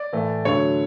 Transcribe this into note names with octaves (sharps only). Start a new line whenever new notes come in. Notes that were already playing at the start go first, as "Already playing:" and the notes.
Already playing: D5
A2 E3 A3
D2 D3 F#3 A3 C#5